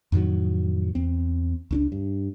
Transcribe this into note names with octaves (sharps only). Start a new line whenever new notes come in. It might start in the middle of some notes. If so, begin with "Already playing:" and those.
F2 A2 D#3 F#3
E2 C4
C#2 C#4 D4
G2